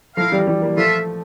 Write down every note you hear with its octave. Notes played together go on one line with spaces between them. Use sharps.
F3 A3 E4 A#4 F5
E3 G3
E3 G3
G3 A#3
F3 A3 F4 A4 E5